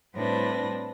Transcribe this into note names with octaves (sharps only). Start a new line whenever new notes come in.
A2 G3 C4 D4 B4 A#6